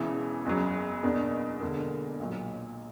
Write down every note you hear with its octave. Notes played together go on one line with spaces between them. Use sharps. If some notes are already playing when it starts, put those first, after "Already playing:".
Already playing: E1 E2 C#3 E3
F#1 E2 C#3 F#3
E2 B2 A#3 D4
E1 E2 D3 A#3
B1 A#2 F#3